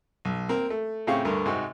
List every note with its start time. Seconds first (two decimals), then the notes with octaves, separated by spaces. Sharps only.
0.25 B1
0.49 A#3 C4 A#4
0.70 A3
1.07 A2 C#3 C4 G4 F5 C#6
1.25 D2 G2 A3 A#4
1.45 G#2 C3 C4 D#4 F#4